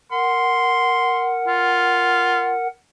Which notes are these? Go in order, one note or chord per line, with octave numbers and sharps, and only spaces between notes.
A#4 F#5 C6
F4